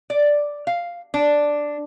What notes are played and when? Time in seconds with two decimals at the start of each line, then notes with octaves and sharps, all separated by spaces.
0.10 D5
0.67 F5
1.14 D4